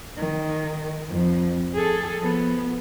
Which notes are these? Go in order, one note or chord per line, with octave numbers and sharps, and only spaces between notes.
D#3
F2 F3
G#4 A4
F3 B3